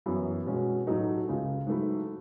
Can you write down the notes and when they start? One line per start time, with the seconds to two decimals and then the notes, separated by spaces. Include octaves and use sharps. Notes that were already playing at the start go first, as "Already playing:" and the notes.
0.06 F#2 E3 B3 E4
0.46 B2 G#3 C#4 F#4
0.87 A2 F#3 A3 D#4 F#4
1.27 C#2 C#3 G#3
1.67 G#2 F#3 A3 E4